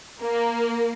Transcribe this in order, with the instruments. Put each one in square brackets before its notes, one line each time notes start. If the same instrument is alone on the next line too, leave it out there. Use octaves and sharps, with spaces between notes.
[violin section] A#3